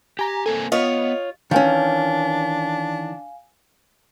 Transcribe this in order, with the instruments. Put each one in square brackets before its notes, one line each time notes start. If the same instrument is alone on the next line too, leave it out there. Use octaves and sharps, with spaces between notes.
[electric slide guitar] G4 [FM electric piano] G#5 A#5
[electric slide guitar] A#3 C4 G#5 [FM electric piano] A4
[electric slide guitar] B3 [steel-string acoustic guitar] F4 C#5 [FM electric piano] D#5
[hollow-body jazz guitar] D#3 E3 C#4 [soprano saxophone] D4 [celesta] F5 G#5